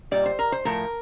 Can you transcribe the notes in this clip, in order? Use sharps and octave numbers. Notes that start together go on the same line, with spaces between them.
A#2 G3 D5
C5
A#4
C5
A2 F3 A3 A#4